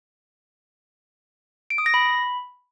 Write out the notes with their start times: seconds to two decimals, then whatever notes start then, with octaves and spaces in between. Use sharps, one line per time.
1.70 D7
1.78 D#6
1.86 A#6
1.94 B5